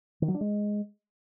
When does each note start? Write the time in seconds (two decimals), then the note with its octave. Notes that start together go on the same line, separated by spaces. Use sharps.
0.22 D#3
0.28 F#3
0.34 D4
0.41 G#3